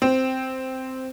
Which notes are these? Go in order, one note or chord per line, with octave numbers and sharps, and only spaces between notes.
C4